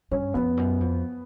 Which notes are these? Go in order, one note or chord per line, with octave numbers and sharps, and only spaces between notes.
G2 C#4
F2 B3
F#2
F2